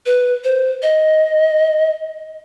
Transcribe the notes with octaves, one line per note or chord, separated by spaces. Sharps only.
B4
C5
D#5